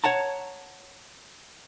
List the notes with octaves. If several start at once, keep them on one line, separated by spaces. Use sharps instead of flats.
C#5 F#5 A5 A#5